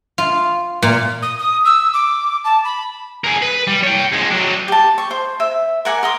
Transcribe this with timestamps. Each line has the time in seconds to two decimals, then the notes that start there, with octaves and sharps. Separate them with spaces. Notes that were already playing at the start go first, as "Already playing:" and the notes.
0.18 F4
0.82 A#2
1.22 D#6
1.39 D#6
1.65 E6
1.93 D6
2.45 A5
2.65 B5
3.24 G#4 A#4
3.42 B4
3.67 G3
3.83 C#5 G5
4.12 F2 G#3
4.31 F#3 D4
4.68 G4 A5
4.98 C#6
5.11 C5
5.40 E5
5.85 A#4 F#5 G#5 D6
6.03 A#4 C6 D#6